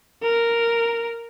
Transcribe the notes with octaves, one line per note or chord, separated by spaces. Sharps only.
A#4